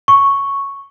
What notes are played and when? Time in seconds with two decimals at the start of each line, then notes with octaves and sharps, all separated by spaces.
0.08 C#6